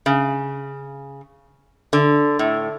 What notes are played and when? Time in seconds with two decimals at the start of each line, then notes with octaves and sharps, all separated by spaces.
0.06 C#3
1.93 D3
2.39 A2